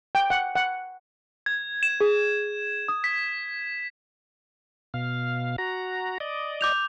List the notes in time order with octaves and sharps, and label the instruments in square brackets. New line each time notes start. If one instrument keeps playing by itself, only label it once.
[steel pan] G5
F#5
F#5
[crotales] G#6
E7
[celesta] G#4
D#6
[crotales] B6
[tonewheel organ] B2 F5
F#4 A#5
D5 D#5
[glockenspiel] D6 G6 F7